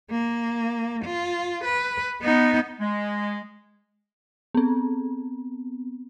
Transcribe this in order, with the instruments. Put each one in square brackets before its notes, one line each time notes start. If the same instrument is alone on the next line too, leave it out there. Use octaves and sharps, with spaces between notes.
[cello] A#3
F4
B4
B3 D#4
[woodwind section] G#3
[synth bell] B3 C4